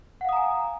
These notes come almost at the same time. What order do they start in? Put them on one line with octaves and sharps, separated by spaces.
F#5 F5 D#6 A#5 G#5